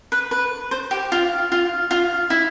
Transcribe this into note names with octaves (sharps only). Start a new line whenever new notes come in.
B4
B4
C5
G4
F4
F4
F4
E4